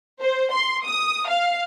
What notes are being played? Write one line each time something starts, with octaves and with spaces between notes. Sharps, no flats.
C5
C6
D#6
F5